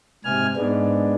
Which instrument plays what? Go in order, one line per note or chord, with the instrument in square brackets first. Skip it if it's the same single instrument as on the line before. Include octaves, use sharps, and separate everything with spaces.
[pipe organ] G#2 G#5 F6 [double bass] C3
[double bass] G#2 [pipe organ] G#3 B3 D4